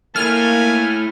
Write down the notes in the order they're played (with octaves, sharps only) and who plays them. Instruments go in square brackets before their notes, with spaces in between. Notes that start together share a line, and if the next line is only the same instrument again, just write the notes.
[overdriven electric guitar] A3 E4 [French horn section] A#3 [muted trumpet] G#5 [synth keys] F6